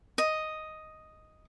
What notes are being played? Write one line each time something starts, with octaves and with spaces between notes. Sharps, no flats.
D#5